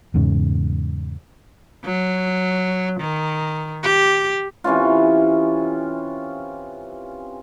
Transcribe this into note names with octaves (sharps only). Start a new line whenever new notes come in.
E2 G#2 C#3
F#3
D#3
G4
C3 E3 C#4 F4